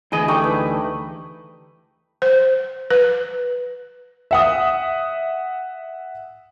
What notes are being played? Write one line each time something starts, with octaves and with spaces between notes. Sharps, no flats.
D2 E3 G#4 D#5 B5
G3 A3 D#4
B4
C5
B4
E5 F#5 D#6